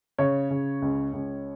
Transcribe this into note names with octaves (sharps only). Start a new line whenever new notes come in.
C#3 C#5
C#3
C#2
C#2